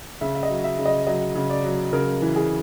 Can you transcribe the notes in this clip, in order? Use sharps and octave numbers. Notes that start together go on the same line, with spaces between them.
C#3 E5
E5
D#5
F#3
E5
C#3
D#5
F#3 D#5
C#3
D5
F#3
C#3 A#4
E3
G#4